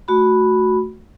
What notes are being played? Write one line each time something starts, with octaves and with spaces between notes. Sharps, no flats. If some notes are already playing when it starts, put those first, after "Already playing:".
A3 F#4 B5